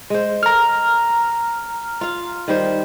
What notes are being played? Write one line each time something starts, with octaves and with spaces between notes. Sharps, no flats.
G#3 C5
A4 A#5 F6
F4 F5
D#3 G3 C5